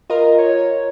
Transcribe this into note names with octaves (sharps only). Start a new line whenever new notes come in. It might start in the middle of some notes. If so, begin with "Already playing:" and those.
F4 A#4 D#5
C#5